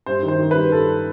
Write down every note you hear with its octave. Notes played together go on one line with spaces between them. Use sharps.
G2 C5
D#3
C5
D#3
G2 B4
G2 A4